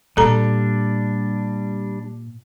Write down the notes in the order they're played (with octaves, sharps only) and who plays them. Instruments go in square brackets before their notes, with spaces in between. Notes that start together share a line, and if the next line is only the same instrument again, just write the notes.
[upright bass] A#2 [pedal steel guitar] G3 D4 [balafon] A4 A#5